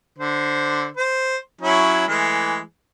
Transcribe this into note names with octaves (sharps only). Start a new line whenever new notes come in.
D3 C5
C5
F#3 C#4 E4
E3 G#3 A3